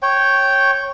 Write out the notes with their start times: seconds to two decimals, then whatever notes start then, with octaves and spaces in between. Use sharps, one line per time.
0.02 C#5 G5